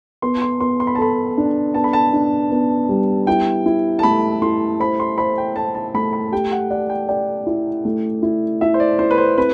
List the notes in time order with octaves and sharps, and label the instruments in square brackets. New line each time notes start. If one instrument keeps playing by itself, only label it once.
[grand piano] B3 [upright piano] C6
[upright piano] C6
[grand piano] B3 [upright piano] C6
[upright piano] C6
B5
A5
[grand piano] A4 [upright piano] B5
[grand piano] D4
[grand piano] B3 [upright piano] A5
[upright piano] B5
A5
[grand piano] D4
B3
G3
[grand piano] E4 [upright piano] G5
[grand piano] E4
[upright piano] A5
[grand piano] A3 [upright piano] B5
[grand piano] E4 [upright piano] C6
[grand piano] C5 [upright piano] B5
[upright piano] C6
[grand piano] C5 [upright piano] B5
[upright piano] G5
[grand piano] C5 [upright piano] A5
[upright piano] A5
[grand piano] A3 [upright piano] B5
[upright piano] B5
[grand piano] G4 [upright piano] G5
[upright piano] F#5
[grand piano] D5 [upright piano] F#5
[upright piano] G5
[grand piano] D5 [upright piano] G5
[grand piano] E4
A3
E4
[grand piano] E4 [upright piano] E5
[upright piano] C5
D5
[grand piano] E4 [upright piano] C5
[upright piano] B4
C5
[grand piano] C4 [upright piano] B4